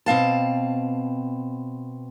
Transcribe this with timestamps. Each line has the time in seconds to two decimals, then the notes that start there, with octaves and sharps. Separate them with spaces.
0.06 B2 C4 F5 A5